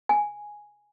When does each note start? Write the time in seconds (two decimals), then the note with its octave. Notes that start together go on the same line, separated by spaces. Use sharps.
0.09 G#5